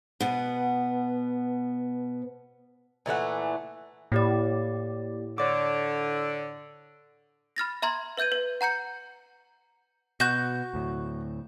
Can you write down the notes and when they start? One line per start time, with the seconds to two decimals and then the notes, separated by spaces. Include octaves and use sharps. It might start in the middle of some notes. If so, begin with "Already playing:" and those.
0.20 B2 B3
3.06 A#2 E3 A3 F#5
4.12 A2 A#3 G4 D5
5.38 D3 C#5 D5 D6
7.56 B5 F6 A6 A#6
7.82 E5 A#5 C6 G#6
8.17 B4 E5 G6 G#6 D#7
8.32 B4
8.61 F#5 A#5 G6 C#7
10.20 B2 F#4 G6
10.74 D2 A2